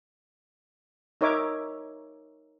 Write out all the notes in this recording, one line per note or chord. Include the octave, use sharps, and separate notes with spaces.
D#4 A#4 C#5 D#5 E5 D6